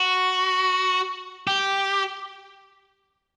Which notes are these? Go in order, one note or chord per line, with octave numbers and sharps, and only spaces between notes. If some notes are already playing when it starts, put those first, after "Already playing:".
Already playing: F#4
G4